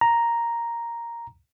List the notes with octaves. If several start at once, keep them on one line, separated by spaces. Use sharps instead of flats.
A#5